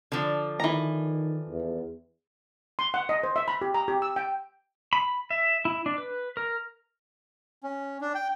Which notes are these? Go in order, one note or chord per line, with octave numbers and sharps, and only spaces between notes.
D3 F3
D#3 E3 A#5
E2
C6
F#5
D#5
C5
E5
B5
G4
A#5
G4
E6
G5
B5
E5
E4
D4
B4
A#4
C#4
D4
G5